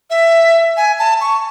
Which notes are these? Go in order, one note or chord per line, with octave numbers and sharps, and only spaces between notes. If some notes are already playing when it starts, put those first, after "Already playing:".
E5
G#5
A5
C#6